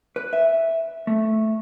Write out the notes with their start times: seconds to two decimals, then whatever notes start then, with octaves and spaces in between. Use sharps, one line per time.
0.16 B4
0.33 E5
1.07 A3